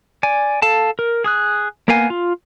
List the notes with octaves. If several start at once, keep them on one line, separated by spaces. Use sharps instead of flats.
D5 G#5
A4 F5 A5
A#4
G#4 D#6 F#6
A#3 B3 A#4 F5 G#5
F4